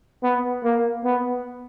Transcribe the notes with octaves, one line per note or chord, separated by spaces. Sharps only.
B3
A#3
B3